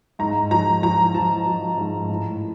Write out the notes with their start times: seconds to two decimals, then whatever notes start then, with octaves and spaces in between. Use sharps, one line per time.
0.19 G#2 A#5
0.51 F3 A#5
0.82 F3 A#5
1.14 F3 A5
1.46 F3
1.78 G#2
2.10 A2